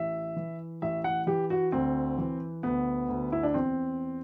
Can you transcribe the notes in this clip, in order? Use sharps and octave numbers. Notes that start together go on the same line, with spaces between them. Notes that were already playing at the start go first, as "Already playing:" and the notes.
Already playing: A1 E5
E3
A1 E5
F#5
E3 G4
F#4
D2 C4
E3
D2 B3
D2
E4
D4
E2 C4